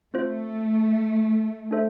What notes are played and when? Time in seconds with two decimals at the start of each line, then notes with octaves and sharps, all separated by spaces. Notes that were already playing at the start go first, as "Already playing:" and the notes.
0.14 A3 C4 F4 C5
1.71 D4 A4 C5 E5